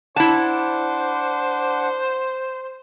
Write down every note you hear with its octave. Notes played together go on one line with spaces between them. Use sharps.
D4 E4 C5 F#5 A5 D6